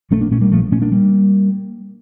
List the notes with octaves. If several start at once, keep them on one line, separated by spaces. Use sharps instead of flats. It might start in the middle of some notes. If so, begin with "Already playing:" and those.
A#1 A3 C#4
A#3 D4
A#2 A3 C#4
G3 A#3
A#1 F3 A3
A#2 A3 C#4
A#3 D4
G3 A#3